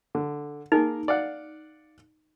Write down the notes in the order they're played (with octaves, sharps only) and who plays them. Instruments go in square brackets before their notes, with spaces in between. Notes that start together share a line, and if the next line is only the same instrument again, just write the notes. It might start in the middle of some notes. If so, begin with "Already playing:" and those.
[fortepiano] D3
[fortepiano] A#3 G#4 A#4 [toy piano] D#4
[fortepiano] D5 F5 F#5